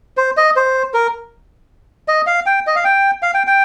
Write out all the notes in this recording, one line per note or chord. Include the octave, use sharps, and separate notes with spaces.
C5
D#5
C5
A#4
D#5
F5
G5
D#5
F5
G5
F5
G5
G5